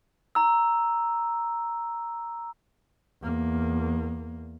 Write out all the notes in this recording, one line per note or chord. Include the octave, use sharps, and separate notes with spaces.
A#5 E6
E2 A#3